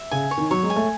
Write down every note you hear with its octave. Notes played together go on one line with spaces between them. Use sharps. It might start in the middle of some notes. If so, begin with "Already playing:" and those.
Already playing: E5
C#3 G#5
C#5
D#3
F#3 C#5
G#3
G#5
A3